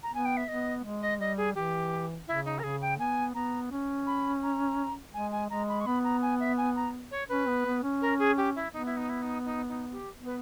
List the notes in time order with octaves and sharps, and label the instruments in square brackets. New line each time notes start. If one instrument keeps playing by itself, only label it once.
[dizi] A#5
[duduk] B3 [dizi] G#5
[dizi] G5
E5
[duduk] B3 [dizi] D#5
[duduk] G#3
[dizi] D#5
[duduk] G3 [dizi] D#5
[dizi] G#4
[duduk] E3 [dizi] G4
[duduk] C#3 [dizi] E4
[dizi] D#4
A#4
[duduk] C#3 [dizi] G#4
[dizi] G5
[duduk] B3 [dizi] G#5
[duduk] B3 [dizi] A#5
[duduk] C#4
[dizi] B5
A#5
[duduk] G#3 [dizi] G#5
[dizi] G#5
[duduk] G#3 [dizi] A#5
[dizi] B5
C#6
[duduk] B3 [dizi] B5
[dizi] A#5
G#5
E5
G#5
A#5
C#5
[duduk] C#4 [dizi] B4
[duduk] B3
B3
C#4
[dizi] A#4
G#4
G4
E4
[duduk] B3 [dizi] D#4
[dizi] E4
D#4
E4
D#4
D#4
D#4
G4
[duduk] B3
[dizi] B4